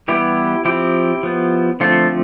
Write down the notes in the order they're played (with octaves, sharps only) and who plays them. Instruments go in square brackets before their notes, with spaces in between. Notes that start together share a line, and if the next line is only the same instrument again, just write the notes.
[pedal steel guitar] E3 G3 B3 E4 G4
F3 C4 E4 G4
F3 B3
D3 F3 A3 C4 F4 A4